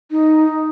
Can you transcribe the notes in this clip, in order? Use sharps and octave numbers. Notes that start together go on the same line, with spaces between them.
D#4